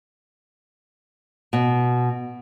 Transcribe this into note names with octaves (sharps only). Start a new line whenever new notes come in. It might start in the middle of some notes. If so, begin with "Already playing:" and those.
B2